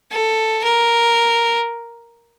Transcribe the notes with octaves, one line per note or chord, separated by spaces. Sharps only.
A4
A#4